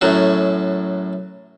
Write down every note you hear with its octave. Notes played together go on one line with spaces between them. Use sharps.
F#2 A2 F#3